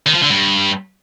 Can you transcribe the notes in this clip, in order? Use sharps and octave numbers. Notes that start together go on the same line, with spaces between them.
D#3
F3
D3
G2